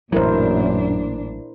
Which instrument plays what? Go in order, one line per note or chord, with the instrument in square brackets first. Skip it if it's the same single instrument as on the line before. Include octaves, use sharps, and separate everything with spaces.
[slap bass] A1 F#3 [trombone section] F#2 [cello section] A#2 D4 [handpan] E4 A#4 C5